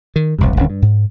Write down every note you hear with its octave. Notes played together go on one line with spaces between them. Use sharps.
D#3
E1 C2 G2
D#1 D2 C#4
G2
G#2